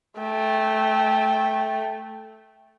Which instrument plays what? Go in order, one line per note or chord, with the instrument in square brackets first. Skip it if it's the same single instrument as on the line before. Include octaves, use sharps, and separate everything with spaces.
[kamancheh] A3 G5